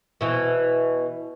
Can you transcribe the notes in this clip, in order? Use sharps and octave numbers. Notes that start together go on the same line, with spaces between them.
B2 E3